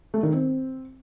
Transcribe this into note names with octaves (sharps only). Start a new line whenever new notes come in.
A3
D#3
C4